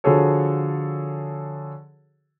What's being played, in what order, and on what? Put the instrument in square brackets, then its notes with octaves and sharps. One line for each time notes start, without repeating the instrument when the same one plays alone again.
[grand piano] D3 F3 F#4 G#4 A4 C#5